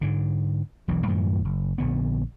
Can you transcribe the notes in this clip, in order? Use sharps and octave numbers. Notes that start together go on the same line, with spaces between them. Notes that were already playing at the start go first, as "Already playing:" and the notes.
G#2 D3
E1 B1 E3
F#2 A2 D#3 F3
F#1
A#1 D3 B3